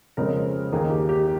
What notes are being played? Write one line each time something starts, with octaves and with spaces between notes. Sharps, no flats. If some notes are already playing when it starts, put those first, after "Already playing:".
F2 C#3 G#3 C4 A#4
D#2 D#3 A#3 G#4
G4
G4